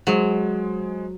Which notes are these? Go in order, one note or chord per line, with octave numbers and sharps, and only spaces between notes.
F#3 G#3 G#4 C5